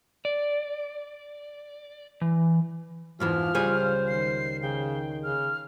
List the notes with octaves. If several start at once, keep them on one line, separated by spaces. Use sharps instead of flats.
D5
E3
F2 G#2 E3 F3 F4 F6
C#2 G3 G#4 C5
D#3 C7
C#3 G5
C#3 F6